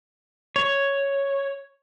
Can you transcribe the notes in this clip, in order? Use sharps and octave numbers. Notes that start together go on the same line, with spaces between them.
C#5